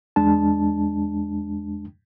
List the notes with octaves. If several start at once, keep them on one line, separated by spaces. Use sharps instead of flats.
E2 G#3 D4 A5